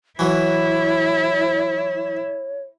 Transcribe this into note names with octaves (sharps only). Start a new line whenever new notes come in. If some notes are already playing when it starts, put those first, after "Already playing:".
E3 F#3 E4 C#5